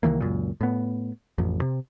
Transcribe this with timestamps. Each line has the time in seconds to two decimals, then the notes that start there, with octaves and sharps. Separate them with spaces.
0.03 C2 D#3 E3 A#3
0.21 C#2 F#2 A#2
0.61 A2 B3
1.38 A1 F2
1.62 C3